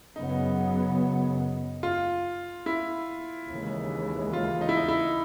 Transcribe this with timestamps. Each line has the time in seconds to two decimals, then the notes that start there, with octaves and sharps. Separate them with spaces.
0.16 F#2 C#3 F#3 B3 D#4
1.83 F4
2.66 E4
3.49 D#2 C#3 E3 G#3
4.33 F4
4.61 D#4
4.69 E4
4.76 D#4
4.88 E4